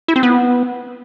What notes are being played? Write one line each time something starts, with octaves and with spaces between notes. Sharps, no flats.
E4
C4
B3